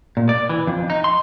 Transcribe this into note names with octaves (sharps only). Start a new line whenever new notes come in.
A#2
D5
E3
F2
D#4
C6